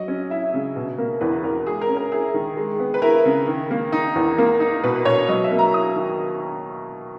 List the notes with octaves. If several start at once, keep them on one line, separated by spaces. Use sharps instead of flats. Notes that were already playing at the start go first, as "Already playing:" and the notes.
Already playing: F#3 D#5
C#4
E4 E5
C#3
B2
A#3
E2 B4
E2 A#4
G#3 G#4
A#4
C#4
A#4
E4 G#4
D#3
G#3
B3
B4
E4 A#4
C#3
D#3
A#3
D#4
E2
A#3
D#4
B2 B4
B2 C#5
F#3 D#5
E5
A#3
A#5
E4 D#6
D#3